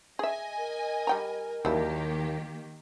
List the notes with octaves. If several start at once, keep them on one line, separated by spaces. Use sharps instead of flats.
G#4 D#5 E5 G#5
A#4
G3 G5 A#5
D#2 D#3 F#3 G3 A#3 E4 G4